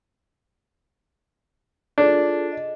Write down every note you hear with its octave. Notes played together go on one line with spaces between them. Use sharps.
D4 F4 G#4 A4
D#5